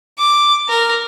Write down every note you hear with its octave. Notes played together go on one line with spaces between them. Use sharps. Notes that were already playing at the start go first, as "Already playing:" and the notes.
D6
A#4